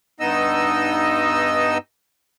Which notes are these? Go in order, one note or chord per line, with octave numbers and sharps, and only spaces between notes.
G2 B3 D#4 D#5 E6